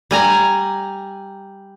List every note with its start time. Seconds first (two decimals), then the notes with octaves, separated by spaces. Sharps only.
0.11 G3 G#5 A#5